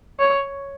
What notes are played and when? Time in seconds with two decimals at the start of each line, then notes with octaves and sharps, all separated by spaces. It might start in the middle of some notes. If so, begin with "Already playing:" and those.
0.19 C#5